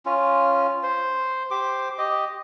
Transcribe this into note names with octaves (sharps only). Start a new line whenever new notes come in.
C#4 F4
C5
G4 C5 D6
G4 D#5